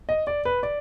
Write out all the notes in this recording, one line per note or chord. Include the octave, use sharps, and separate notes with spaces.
D#5
D5
B4
D5